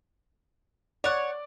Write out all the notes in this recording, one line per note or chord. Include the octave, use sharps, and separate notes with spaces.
C#5 D5 F#5